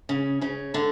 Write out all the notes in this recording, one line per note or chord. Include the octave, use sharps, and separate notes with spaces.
C#3 C#4
C#3 C#4
D3 D4